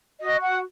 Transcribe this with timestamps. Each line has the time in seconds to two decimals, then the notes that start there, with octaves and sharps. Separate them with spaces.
0.21 F#4 D#5
0.41 F#5